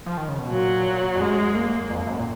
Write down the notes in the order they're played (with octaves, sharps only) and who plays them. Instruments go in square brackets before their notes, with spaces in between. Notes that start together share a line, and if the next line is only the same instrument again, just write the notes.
[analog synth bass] F3
D#3
C#3
B2
[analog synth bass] A#2 [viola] F#3
[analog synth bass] F2
[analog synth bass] F#2 [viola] G#3
[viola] A#3
[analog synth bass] F2
F#2
A#2